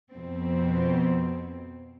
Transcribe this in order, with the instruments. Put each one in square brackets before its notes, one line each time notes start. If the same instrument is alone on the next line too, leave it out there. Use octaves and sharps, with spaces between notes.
[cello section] F2 B2 C4